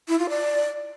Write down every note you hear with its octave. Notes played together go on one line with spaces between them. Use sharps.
E4
F4
D5